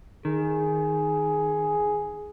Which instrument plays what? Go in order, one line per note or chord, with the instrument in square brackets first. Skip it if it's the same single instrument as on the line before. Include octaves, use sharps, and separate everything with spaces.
[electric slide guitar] D#3 [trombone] G#4